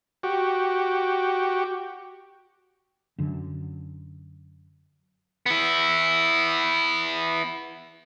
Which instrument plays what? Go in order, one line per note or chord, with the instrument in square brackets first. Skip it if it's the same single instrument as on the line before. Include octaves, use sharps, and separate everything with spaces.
[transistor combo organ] F#4 G4
[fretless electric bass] F#2 D3
[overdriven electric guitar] B3 E4